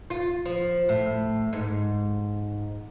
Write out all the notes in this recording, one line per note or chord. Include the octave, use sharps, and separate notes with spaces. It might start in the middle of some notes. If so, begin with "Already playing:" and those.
F4
F3
A2
G#2